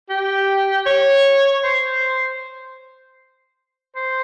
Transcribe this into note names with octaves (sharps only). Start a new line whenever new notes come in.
G4
C#5
C5
C5